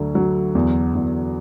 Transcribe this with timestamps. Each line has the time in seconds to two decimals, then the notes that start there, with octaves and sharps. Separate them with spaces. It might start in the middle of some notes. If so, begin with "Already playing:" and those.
Already playing: D2 D3 F#3
0.15 F#3
0.55 E2
0.95 E2